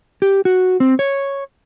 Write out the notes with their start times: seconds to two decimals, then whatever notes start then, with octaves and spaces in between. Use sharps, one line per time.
0.22 G4
0.45 F#4
0.80 C4
0.99 C#5